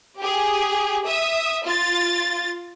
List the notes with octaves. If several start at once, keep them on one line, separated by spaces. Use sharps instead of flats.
G4 G#4
E5 D#6
F4 A6